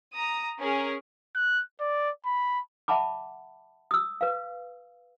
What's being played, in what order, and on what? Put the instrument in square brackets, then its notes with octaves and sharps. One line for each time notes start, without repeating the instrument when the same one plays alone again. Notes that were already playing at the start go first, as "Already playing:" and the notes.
[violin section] A#5 D#6
C#4 G#4 A#4
[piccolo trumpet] F#6
D5
B5
[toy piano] E5 F#5 A5 B5 D6
D#6 E6
B4 F5